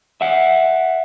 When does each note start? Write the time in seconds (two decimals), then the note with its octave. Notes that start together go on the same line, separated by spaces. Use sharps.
0.21 E5 F#5